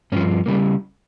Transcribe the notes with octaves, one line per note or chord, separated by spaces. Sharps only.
G2 F3 C#4
C#3 G3 A#3